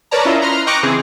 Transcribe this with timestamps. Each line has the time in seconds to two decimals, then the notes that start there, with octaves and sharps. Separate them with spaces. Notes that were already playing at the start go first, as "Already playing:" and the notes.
0.11 A#4 B4 C#5 D5 A5 A#5
0.25 C#4 E4 F4 A#4 D#5 E5
0.41 B4 A#5 C6 F6
0.66 D#5 G5 A#5 C#6 D6 F#6
0.83 C#3 E3 C4 G#4